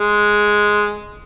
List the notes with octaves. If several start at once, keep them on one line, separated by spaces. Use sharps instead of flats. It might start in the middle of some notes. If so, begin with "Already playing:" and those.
G#3